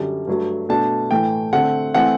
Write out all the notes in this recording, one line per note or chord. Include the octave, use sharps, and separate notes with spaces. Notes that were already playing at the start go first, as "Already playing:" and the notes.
Already playing: F#2 D3 G3
G2 F#3 A3
B2 A3 D4 A5
A2 E3 A3 G5
D3 A3 C4 F#5
E3 A3 C4 F#5